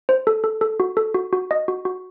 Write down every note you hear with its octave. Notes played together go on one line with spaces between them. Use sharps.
C5
A4
A4
A4
F#4
A4
F#4
F#4
D#5
F#4
F#4